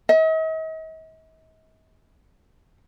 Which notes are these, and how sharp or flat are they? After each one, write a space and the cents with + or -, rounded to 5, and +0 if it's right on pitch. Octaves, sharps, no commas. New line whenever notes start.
D#5 +45